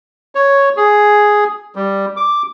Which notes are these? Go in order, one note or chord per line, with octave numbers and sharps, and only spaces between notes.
C#5
G#4
G3
D6